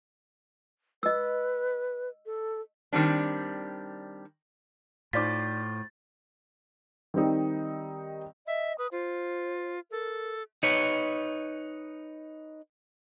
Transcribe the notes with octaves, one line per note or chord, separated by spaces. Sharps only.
B4 D#5 E6
A4
D#3 G3 C4 D4
A2 D#4 F4 C5 D5 D6 A6 B6
D#3 G3 C4 D#4
D#5 E5
B4 D#6
F4 C5
A4 A#4
D#4 B4 C#5